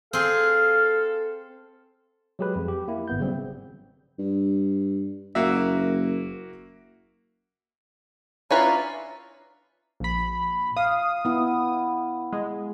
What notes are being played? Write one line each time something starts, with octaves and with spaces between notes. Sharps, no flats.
C4 G#4 A4 F5
F#3 G#3 G4 G#4 B4
F2
G4
A#3 E4
G#1 B3 G6
C#3 F#3 G3 C4
G2
F#1 A#3 F#4 E5
C#4 D4 E4 F4 B4 A#5
A#1 B5
F5 D#6
B3 E4
G#3